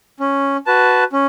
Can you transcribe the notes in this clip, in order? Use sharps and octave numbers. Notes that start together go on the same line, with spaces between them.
C#4
F#4 B4 A5
C#4